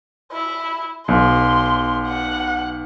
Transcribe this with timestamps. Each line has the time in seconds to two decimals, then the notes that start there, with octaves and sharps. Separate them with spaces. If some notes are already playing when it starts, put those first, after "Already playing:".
0.32 E4
1.08 B1 C6
2.07 F#5